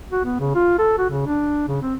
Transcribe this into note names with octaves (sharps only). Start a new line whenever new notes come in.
F#4
B3
C#3
F4
A4
F#4
C#3
D4
C#3
C4